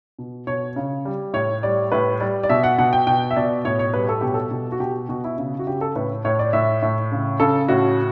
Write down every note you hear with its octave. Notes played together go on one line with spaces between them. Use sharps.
B2
B2 C#5
C#3
G3
A2 C#5
G3 D5
A2 B4
G3 D5
D5
B2 E5
F#5
B2 F#5
G5
B2 G5
E5
B2 D5
A2 C#5
C#5
G3 B4
A4
B2 G4
A4
B2
F#4
B2 G4
B2 F#4
E4
C#3
F#4
C#3 G4
A4
A2 B4
A2 C#5
D5
A2 E5
A2
C#3
C#3 A4
A2 F#4